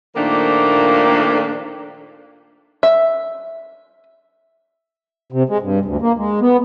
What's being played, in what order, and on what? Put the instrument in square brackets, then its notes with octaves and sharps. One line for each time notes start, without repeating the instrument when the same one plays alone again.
[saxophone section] A#2 D#3 F3 A3 A#3 D4
[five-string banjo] E5
[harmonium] C3
G#3
G2
D2
A#3
G#3
B3